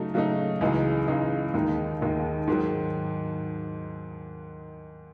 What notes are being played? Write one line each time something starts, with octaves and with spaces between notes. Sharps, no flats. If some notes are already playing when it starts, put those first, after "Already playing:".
Already playing: C#3 F#3 A3 D#4
C#3 F#3 A3 D#4
C#2 C#3 E3 G#3 D#4
C#2 C#3 E3 G#3 D#4
D#2 D#3 G#3 D#4
D#2 D#3 G#3 D#4
G#2 D#3 F#3